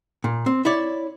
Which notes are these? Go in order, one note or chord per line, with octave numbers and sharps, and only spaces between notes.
A#2
C4
E4 C#5 D5